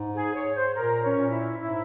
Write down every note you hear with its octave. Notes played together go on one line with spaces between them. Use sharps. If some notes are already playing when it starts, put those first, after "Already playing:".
Already playing: G#2
G#4
C#5
C5
A#2 A#4
C#4
A#2
E4
G#2 E4